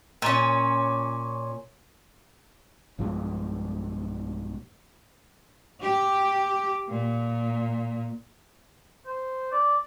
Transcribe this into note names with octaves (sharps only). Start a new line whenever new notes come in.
A#2 C#4
B1 G2 F3 G#3
G4
A#2
C5
D5